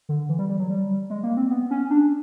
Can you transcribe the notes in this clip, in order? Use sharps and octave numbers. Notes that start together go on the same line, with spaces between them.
D3
E3
G3
G3
F#3
G3
G#3
A#3
C4
B3
C#4
D4